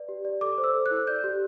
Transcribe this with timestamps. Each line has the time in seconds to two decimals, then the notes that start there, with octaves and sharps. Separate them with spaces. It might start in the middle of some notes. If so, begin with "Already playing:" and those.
Already playing: B4 D5
0.09 G4
0.25 D5
0.41 A4 D6
0.58 C5
0.64 E6
0.75 A4
0.86 F#6
0.91 E4
1.07 D5 G6
1.24 G4